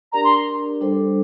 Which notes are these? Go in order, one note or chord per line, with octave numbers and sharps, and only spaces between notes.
D4 G4 A#4 D5 A#5
C6
G3 D4 A4 C5